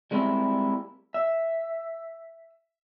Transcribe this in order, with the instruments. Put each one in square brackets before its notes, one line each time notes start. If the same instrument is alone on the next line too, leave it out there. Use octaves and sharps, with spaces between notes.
[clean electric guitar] G3 G#3 A#3 C4 E4 G4
E5